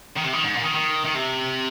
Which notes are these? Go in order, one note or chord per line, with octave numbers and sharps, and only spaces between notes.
D#3
C3
D#3
G#2
A#2
D#3
D#3
D#3
C3